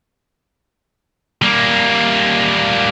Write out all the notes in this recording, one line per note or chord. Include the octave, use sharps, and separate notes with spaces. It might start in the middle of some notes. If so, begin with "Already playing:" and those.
G3 A#3